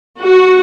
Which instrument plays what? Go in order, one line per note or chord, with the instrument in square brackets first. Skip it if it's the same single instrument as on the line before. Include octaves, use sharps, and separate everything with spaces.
[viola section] F#4